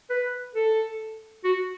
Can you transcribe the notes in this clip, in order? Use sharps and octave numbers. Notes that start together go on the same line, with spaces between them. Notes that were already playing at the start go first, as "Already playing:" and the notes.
B4
A4
F#4